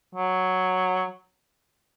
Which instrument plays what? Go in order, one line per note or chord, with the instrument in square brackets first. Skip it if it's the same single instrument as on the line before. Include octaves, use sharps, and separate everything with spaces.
[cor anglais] F#3